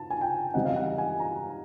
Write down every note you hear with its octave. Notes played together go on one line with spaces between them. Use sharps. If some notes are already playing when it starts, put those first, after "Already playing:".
Already playing: A5
G#5
G5
E3 G3 C4 D#4 F#5
F5
F#5
G#5
A#5